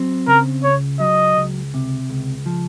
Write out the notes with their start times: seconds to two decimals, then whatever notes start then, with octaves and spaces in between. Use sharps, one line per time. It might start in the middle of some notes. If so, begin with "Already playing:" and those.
Already playing: F#3 C4
0.27 C#3 A#4
0.64 C#2 C#5
1.00 F#3 D#5
1.37 C#2
1.74 C3
2.10 C#2
2.46 F3